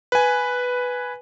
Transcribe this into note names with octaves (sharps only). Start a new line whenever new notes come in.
B4 G#5